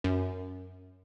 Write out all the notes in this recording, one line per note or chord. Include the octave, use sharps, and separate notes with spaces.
F#2